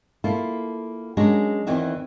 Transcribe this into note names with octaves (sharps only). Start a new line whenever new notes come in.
A#3 E4 F4 A4
F#3 G#3 C#4 D4 F#4 A#4
E2 D#3 E3 C4 F#4 E5